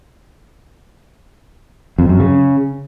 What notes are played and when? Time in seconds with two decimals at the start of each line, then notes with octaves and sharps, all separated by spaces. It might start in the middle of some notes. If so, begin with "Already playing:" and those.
1.99 F2
2.09 F#2
2.20 C#3